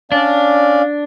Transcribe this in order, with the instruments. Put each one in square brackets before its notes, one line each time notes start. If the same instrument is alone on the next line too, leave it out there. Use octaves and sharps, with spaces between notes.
[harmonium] C#4 D5 F5 [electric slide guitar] D4